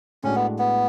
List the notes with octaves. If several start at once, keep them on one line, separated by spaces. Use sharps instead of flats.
A2 G#3 C#4 D4 F#4
B3
B3